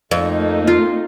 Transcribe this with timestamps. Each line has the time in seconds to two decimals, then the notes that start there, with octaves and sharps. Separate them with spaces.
0.11 F2 A3 A#3 D#4
0.67 F4